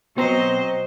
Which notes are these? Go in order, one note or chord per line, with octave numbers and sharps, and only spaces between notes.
B2 F#3 C4 C5 D#5 A#5